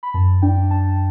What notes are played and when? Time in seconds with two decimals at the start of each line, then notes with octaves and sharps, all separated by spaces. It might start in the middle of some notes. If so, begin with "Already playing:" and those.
0.03 B5
0.14 F#2 A5
0.42 D4 G5
0.71 D4 A5